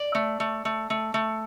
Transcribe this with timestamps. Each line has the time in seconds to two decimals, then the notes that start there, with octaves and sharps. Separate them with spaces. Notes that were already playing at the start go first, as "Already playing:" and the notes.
Already playing: D5
0.15 A3
0.40 A3
0.65 A3
0.90 A3
1.14 A3